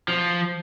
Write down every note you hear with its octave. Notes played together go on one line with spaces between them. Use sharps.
F3